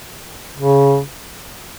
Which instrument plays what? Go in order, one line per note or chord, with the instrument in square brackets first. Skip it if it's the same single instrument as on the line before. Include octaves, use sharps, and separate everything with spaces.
[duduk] C#3